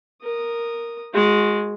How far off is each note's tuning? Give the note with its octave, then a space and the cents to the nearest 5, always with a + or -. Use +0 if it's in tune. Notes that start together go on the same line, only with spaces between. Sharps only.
A#4 +0 D#6 -10
G#3 +0 F#4 -30